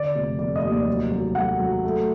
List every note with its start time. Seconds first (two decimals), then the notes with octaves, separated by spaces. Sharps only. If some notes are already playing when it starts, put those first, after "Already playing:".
Already playing: D3 D5
0.15 F1
0.39 F1 D5
0.56 D#5
0.64 D#2
0.72 D5
0.87 F#3
1.12 F#3
1.35 F#3 F#5
1.60 F#3
1.84 A3